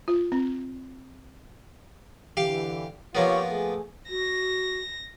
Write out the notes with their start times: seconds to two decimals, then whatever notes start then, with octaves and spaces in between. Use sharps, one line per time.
0.08 F4
0.32 C4
2.37 D3 E3 G4 F5
3.15 F3 A#3 B3 F4 G4 C#5
3.49 A3 G#4
4.10 F#4 A#6